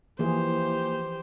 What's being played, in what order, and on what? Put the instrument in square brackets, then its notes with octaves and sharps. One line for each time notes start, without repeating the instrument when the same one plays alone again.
[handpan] E3 F3 G#4 [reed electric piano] A#3 E4 [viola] G4 C5